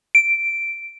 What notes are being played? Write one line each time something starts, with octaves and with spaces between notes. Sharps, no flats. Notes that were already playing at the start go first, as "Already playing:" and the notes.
D7